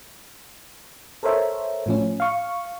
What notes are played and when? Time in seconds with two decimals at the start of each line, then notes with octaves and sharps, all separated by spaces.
1.23 A4 A#4 C5 C#5 E5
1.86 A2 F3 C#4
2.20 F5 C#6